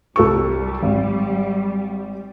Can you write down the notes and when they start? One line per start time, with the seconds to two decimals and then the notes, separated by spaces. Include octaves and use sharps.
0.16 C2 G3 A4 C#6
0.83 G#1